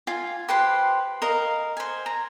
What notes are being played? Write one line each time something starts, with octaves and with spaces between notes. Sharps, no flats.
F4 G#5
G4 B4 C5 C6
A#4 D#5 F5
C5 G#5
A#5